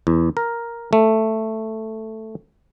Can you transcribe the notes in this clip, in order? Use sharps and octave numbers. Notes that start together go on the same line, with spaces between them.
E2
A#4
A3